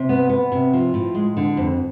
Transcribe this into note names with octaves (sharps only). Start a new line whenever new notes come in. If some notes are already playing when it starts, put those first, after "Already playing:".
Already playing: C3
B3
B3
C3
F3
A2
G#3
D3
F2